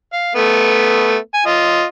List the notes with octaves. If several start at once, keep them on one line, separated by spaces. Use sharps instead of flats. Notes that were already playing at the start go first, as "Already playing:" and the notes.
F5
A3 B3
G#5
F4 D#5